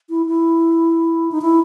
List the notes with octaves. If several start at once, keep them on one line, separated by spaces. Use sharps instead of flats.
E4
E4
D#4
E4